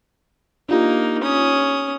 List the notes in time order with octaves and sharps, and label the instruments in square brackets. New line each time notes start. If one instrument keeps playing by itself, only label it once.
[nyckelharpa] A#3 D#4 [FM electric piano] D4 F4 G4
[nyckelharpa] C#4 D#6